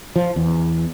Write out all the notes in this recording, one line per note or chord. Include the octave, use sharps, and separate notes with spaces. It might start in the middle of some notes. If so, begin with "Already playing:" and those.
F3
E2